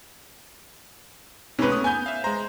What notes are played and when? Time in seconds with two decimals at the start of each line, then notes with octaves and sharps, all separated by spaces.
1.59 G#2 C3 C#4 B4
1.72 A3 D#6
1.84 B3 G#5 G6
2.06 E5 F5
2.24 G#3 C5 A#5